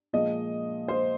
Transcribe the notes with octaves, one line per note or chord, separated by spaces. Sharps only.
A#2 F3 G#3 D#5
C5